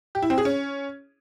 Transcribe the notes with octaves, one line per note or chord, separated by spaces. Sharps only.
G4
E4
C4
G#4
C#4